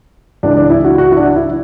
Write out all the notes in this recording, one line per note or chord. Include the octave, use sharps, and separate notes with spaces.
C#2 C#3 E3 D4
D4
E4
F#4
F#4
E4
D4
E4